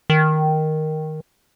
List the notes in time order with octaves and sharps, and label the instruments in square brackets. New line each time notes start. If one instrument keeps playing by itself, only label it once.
[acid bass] D#3